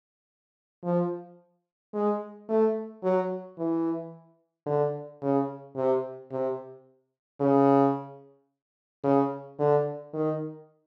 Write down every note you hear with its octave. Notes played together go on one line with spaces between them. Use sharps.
F3
G#3
A3
F#3
E3
D3
C#3
C3
C3
C#3
C#3
D3
D#3